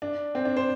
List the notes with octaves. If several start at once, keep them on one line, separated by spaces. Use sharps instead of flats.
D4
C4
D4
C5